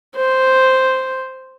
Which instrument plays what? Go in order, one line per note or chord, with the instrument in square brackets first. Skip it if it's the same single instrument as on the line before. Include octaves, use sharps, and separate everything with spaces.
[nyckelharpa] C5